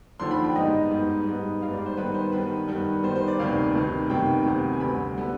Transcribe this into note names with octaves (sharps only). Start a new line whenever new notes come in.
D#2 D3 F3 C6
B5
G5
G#2 G3 B3 D#5
G#2 G3 B3
G#2 G3 B3
G#2 G3 B3 F5
D5
C5
G2 D#3 G3 B3 B4
C5
G2 D#3 G3 B3 B4
G2 D#3 G3 B3
G2 D#3 G3 B3 C5
C5
D5
D2 C3 D#3 B3 F5
D2 C3 D#3 B3
D2 C3 D#3 B3 G5
D2 C3 D#3 B3
G#5
D2 D3 G3 B3 B5
D3 G3 B3